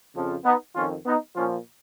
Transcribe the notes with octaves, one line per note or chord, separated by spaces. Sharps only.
F2 C#3 F3
B3 D#4
F2 D#3 C#4 F4
B3 D#4
A#2 F3 C#4 F4